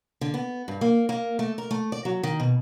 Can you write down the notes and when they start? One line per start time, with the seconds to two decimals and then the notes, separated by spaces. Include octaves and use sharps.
0.21 D3
0.34 B3
0.68 G2
0.81 A#3
1.09 A#3
1.39 A3
1.58 A#4
1.71 A3
1.92 D5
2.05 F#3
2.23 D#3
2.40 B2